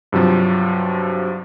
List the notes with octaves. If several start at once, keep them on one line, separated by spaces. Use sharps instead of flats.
G2 C3 F3 F#3